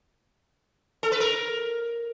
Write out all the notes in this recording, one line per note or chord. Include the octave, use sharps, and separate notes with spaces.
A4
B4
A#4